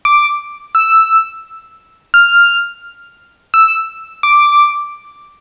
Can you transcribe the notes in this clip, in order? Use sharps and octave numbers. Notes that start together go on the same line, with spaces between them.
D6
E6
F6
E6
D6